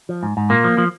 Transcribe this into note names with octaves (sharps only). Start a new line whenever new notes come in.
F3
G#2
G#2
A#2 A#3
F3
F3